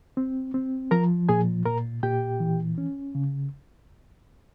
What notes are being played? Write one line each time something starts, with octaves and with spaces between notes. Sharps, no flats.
C4
C4
F3 A#4 A#5
A#2 G#4 G#5
A#2 A#4 A#5
A#2 G4 G5
E3
C#4
C#3